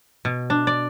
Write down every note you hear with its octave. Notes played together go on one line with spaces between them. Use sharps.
B2
D4
D5